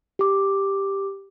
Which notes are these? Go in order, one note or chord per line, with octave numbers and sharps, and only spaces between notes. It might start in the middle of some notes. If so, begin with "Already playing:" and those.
G4 D6